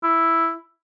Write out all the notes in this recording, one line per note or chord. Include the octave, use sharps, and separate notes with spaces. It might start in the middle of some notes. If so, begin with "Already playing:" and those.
E4